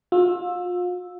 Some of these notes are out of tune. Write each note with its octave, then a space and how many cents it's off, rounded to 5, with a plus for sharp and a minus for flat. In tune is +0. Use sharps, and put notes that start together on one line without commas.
F4 +35 E6 +0